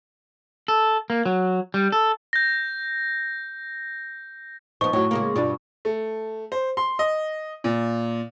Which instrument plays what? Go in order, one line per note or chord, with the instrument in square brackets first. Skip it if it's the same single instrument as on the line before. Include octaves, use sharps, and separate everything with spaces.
[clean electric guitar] A4
A#3
F#3
G3
A4
[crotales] G6 A#6
[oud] F3 B3 [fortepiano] D#4 C5 [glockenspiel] C#6
[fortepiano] A2 F#4 [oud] F#3
[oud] C#3 G#3 A#3
[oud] G2 B2 G3 [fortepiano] D4 F4
[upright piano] A3
C5
C6
D#5
A#2